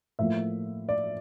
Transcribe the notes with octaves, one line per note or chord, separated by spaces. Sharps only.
A2 F3 A#3 E5
D5